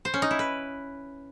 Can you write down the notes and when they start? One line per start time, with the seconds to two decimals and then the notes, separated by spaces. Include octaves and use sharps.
0.05 C5
0.14 C#4
0.22 D#4
0.31 E4
0.39 B4